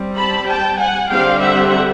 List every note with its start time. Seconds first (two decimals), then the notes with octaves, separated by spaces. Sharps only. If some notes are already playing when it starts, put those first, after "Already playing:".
Already playing: G3 C4
0.17 A5 B5
0.48 G5 A5
0.79 F#5 G#5
1.10 D3 G3 C4 F5 G5
1.41 E5 F#5